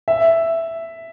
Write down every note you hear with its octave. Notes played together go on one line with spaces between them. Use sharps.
E5